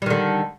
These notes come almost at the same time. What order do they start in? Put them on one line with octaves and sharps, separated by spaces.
G3 D#3 D3